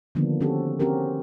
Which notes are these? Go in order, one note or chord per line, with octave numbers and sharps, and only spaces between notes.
D3 D#3 F3 A#3 B3 D4
C4 C#4 F#4 G4 A4
C4 C#4 F#4 G4 A#4